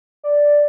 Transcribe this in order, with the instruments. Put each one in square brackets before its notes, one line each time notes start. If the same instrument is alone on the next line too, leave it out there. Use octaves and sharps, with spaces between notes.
[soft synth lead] D5